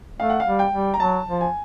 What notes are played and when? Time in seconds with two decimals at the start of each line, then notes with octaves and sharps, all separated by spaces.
0.19 A3 F5
0.30 F#5
0.40 F5
0.46 G3
0.59 G5
0.73 G3
0.94 A#5
1.00 F#3 A5
1.28 F3
1.41 G#5